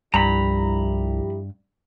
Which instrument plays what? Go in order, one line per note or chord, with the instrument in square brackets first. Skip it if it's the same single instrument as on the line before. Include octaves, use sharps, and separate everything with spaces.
[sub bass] C2 [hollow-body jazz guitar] G2 [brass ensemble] F3 E4 G4 [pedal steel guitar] A#5 B5